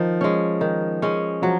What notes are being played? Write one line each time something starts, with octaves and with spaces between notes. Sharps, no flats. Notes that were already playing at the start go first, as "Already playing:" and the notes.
Already playing: D#3 F3
G#3 C#4
D#3
G#3 C#4
F3 F#3